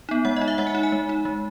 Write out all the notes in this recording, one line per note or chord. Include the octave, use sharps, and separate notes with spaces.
B3 D#4
G#3 F#5
D#4 D#5
E5
G#3 F#5
G#5
D#4 F#5
G#5
G#3
D#4
G#3